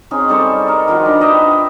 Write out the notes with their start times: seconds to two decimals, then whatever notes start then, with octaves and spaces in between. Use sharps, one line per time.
0.11 C4 C#4 D#4 G#4
0.29 G3 A4 C5 C#6
0.68 A#4 D#5
0.88 D#3 F3 F4 F#4
1.05 D4 A#5 B5
1.20 B4 D#5 E5 G5